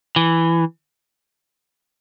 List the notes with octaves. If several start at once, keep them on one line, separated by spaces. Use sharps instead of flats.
E3